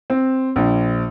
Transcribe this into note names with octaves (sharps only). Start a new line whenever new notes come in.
C4
A#1